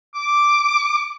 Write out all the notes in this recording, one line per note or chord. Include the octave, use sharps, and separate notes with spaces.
D6